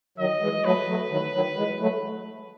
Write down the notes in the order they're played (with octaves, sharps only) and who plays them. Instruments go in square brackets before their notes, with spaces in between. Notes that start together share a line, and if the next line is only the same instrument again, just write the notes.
[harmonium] D#3 F#3 [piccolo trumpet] D#5
[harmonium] E3 G#3
[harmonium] F#3 A3 [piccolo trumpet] B4
[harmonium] F#3 A3
D#3 F#3
D#3 F#3
E3 G#3
F#3 A3